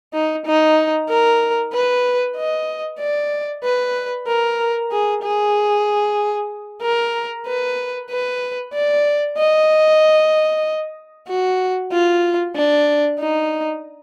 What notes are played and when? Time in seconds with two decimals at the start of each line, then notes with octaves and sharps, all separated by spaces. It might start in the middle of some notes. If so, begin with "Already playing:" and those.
0.13 D#4
0.46 D#4
1.09 A#4
1.73 B4
2.37 D#5
3.00 D5
3.64 B4
4.28 A#4
4.92 G#4
5.23 G#4
6.82 A#4
7.46 B4
8.10 B4
8.73 D5
9.37 D#5
11.28 F#4
11.92 F4
12.56 D4
13.20 D#4